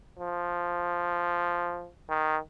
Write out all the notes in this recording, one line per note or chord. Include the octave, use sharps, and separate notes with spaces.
F3
D#3